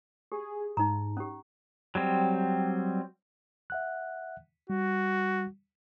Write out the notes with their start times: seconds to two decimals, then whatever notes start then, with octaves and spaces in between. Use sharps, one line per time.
0.32 G4 G#4
0.77 G#2 D#4 A#5
1.17 C#4 G4
1.95 F#3 G3 C4
3.70 E5 F#5 F#6
4.70 G3 F#4